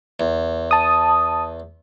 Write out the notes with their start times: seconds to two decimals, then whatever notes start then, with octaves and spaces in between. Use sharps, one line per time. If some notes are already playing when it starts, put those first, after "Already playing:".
0.20 E2
0.71 A5 D#6